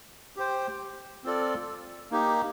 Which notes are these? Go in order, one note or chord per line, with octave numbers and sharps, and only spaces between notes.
G4 C5 G5
C4 F4 A4 D5
A#3 D#4 G4